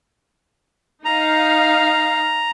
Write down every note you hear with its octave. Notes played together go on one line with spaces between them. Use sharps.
D#4 F5 A#5